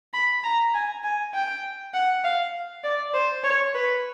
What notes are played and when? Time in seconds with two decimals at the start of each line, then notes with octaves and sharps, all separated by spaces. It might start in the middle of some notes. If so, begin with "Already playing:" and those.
0.13 B5
0.43 A#5
0.74 G#5
1.04 G#5
1.34 G5
1.94 F#5
2.24 F5
2.84 D5
3.14 C5
3.44 C#5
3.74 B4